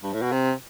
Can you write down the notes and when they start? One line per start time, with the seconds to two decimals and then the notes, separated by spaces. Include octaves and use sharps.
0.03 G2
0.13 A2
0.22 B2
0.32 C3